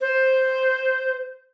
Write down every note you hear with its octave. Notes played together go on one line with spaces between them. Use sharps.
C5